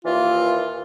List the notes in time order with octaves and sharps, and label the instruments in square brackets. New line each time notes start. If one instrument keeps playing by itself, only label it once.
[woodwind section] D#2 A#2 E3 [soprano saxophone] F4